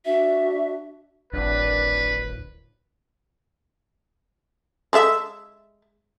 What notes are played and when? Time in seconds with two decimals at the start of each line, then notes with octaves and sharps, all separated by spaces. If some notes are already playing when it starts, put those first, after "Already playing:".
0.05 D4 F#4 E5
1.33 D1 G#1 D4 B4
4.93 G#3 A4 E5